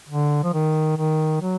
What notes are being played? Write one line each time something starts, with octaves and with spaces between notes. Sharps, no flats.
D3
F3
D#3
D#3
F#3